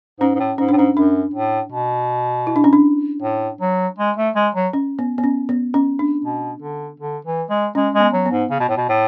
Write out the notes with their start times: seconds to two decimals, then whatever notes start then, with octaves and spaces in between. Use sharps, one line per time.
0.20 G#2 C#4
0.35 G#2
0.40 A2
0.58 G#2 C#4
0.69 A2 D4
0.77 G#2 C#4
0.97 F#2 D4
1.34 A2
1.72 B2
2.47 E4
2.56 D4
2.64 C#4
2.73 D4
3.22 A2
3.61 F#3
3.98 G#3
4.17 A3
4.36 G#3
4.55 F#3
4.73 C#4
4.99 B3
5.18 B3
5.24 C#4
5.49 B3
5.74 C#4
5.99 D4
6.25 B2
6.62 D3
7.00 D3
7.25 E3
7.50 G#3
7.75 G#3 C#4
7.94 G#3
8.00 B3
8.14 F#3
8.26 B3
8.32 G#2
8.50 C#3
8.60 B2
8.69 A2
8.77 B2
8.89 A2